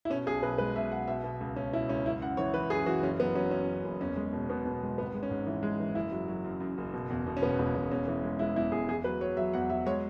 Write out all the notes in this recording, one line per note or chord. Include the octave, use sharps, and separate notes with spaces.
E4
B2 C#4
B1 G#4
B1 B4
G#3 B4
B2 E5
B1 F#5
B2 E5
B2
C#2
B2 C#4
B2 E4
C#2 C#4
F#2 E4
F#2 F#5
E3 C#5
E3 B4
F#2 G#4
E3 F#4
F#1 C#4
F#3 B3
F#3 C#4
F#2 C#4
F#2
F#1
E2 C#4
G#3
B2
B2 B3
B2
G#3
G#1 B3
G#3
C#4
G#2
E3
G#3
E3
F#1 E4
F#3
F#3
F#2
F#2
F#1
B2
E2
B2
C#4
E1 B3
E1
E1
E2 C#4
E3
G#3
G#3 E4
E2 E4
E2 G#4
E2 G#4
F#3 B4
F#3 C#5
F#3 E5
E2 F#5
F#3 E5
G#3 C#5